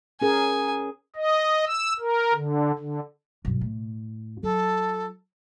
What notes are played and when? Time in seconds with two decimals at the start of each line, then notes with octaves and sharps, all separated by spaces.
0.22 C#4 G#4 A#4 G#5
1.16 D#5
1.66 E6
1.99 A#4
2.34 D3
2.79 D3
3.45 B1 G2
3.61 A2
4.43 F#3 F4 A4